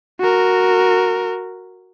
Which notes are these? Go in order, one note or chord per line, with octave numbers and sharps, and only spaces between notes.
F#4 A#4